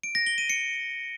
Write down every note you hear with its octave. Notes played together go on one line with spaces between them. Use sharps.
D7
A#6
G7
D#7
C#7